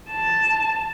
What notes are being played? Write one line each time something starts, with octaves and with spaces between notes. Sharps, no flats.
A5